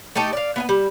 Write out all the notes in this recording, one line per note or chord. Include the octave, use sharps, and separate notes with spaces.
A3 D#4 G4 A4
D5 F5
B3 F5 G#5
G3